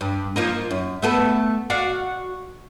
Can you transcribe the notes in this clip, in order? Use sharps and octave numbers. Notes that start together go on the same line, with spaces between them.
G2
F3 A#3 D#4
F#2
A3 B3 A4
F#4 D5 F5